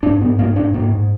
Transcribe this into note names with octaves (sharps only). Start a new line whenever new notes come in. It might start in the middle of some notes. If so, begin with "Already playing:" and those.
G#2 D4
G#2 B3
G#2 A#3
G#2 D4
G#2 A#3
G#2